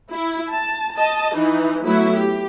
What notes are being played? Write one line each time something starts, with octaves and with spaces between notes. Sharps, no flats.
E4
A5
D#5 A5
E3 D#4
F#3 A3 B3 E4 F#4
G4